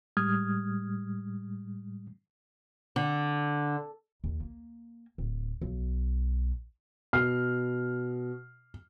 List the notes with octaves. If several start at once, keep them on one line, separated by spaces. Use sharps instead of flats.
A2 G3 G#3 D#6 F6 G#6
D3
D#2
A#3
D1
B1
B2 F6 C7